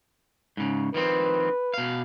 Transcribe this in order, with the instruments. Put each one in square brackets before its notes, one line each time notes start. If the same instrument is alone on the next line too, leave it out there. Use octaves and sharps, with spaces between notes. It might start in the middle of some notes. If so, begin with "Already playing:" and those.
[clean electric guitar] G#2 C#3
[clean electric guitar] D#3 F3 C4 [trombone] B4
[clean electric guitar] B2 F5